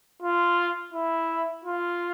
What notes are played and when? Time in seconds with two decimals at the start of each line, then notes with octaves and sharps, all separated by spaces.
0.22 F4
0.93 E4
1.65 F4